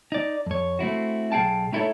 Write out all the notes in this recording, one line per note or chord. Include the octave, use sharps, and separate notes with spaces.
D#4 D5
F2 C#5
A3 C4 E4 F#4
B1 G#4 F5 G5 A5
A3 D#4 E4 F#4 A4 C#5